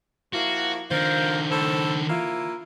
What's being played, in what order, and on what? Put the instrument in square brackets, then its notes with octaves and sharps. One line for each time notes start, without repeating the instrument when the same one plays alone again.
[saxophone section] F3 A#3 E4 [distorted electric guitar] F#4
[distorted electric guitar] D#3 D4 [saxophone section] F4 A#4 C5
[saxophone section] A2 A4 C5
A#3 E4 F4